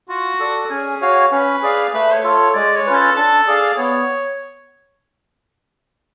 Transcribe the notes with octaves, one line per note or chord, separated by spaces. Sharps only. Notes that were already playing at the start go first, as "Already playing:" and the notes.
F4 F#4
A4 D5
C#4 G#4
F#4 C#5 F5
C#4 B4
G#4 D5 F5
A3 B4
C#5
F4 A4
C#5
G#3 D5
C#5
C#4 F4 B4
A4
D4 A4
G#4 D5 F5
B3 C#5